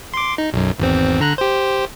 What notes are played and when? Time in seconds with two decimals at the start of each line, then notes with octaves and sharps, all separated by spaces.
0.14 C6 D6
0.38 D#4
0.53 B1 F#2
0.79 G#1 E2 C4
1.20 D3 A#5 F#6
1.38 G4 C5